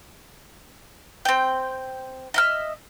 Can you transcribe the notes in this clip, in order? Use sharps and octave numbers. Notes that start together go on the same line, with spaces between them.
C4 G5
D#5 E5 F6